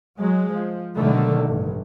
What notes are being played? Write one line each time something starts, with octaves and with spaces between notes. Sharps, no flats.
F#3 G#3
F3
B2 D3 D#3 F#3 G#3 A3
A1 G2